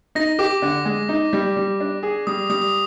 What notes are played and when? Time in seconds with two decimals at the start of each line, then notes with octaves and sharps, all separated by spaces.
0.15 D#4 A#6
0.39 G4 D6
0.62 D3
0.85 G#3
1.09 D#4
1.33 G3
1.57 G3
1.80 D4
2.03 G#4
2.27 G3 D#6
2.50 G3 D#6